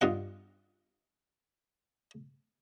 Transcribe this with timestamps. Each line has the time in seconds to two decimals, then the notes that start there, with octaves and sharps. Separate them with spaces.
0.01 G2 F4 G4 D#5 F#5